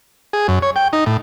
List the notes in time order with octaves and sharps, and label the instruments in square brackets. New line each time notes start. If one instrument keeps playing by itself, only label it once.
[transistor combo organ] G#4
F#2
C#5
G5
D#4
A2